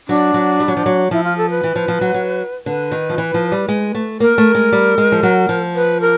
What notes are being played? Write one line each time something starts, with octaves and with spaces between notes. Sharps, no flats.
F#3 D4
F#3
G3
F#3
F3
F#3
F3 E4
F4
A4
B4
E3
F3
F3
F#3
F#3
D3 B4
D#3
F3
E3
F3
G3
G#3
A3
A#3 A#4
A3
G#3
G3
G#3
F3
F#3
F3
B4
A#4